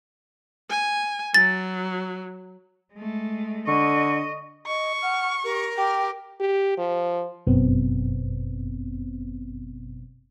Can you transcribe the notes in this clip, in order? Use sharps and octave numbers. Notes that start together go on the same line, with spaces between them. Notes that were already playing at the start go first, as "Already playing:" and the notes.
G#5
F#3 A6
G#3 A3
D3 D#5 C#6
D#5 C#6
F#5 F6
G4 A#4
G4 G5
G4
F3
G1 F#2 B2 B3 C4